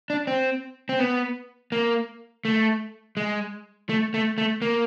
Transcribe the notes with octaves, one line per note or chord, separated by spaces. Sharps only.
D4
C4
C4
B3
A#3
A3
G#3
A3
A3
A3
A#3